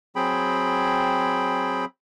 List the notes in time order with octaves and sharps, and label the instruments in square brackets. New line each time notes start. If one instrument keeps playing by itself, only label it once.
[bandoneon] F#3 C4 G#4 G5 B5